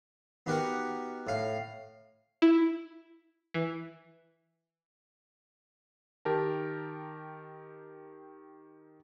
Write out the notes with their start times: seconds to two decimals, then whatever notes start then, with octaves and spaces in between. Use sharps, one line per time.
0.46 B3 D#4 F#4 G4 A#4 F#5
1.27 A2 F5
2.42 E4
3.54 E3
6.25 D#3 G4 A#4 A5